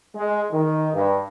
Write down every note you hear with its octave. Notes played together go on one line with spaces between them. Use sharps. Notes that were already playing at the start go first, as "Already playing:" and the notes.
G#3
D#3
G2